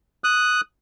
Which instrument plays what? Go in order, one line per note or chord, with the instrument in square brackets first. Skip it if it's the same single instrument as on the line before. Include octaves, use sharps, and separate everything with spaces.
[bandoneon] D#6 F#6